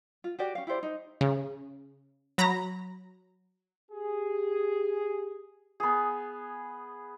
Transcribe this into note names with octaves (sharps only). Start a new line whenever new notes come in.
F4
F#4 G4 D5
C#4 F5
E4 G4 C5 D5
D#4
C#3
F#3 A#5 B5 A#6
G4 G#4
B3 G#4